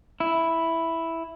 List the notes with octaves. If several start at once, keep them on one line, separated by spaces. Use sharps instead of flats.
E4